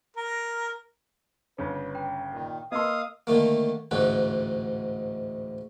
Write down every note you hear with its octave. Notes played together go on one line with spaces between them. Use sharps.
A#4
G1 C#3 B4
G5
A#2 D#3
A#3 B4 D#5 F5 C6 D#6 E6
D3 D#3 A3 A#3
A1 D2 G#2 D3 B4